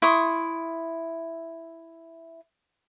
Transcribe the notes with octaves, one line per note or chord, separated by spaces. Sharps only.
E4 C6 C#6 D#6